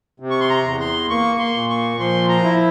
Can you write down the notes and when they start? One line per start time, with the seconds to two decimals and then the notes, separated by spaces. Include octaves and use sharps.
0.20 C3
0.30 C#6
0.40 C6
0.49 A#5
0.64 E2
0.80 C6
1.09 A#3 C#6
1.39 C6
1.54 A#2
1.69 C#6
1.99 F3 C6
2.29 A#5
2.44 E4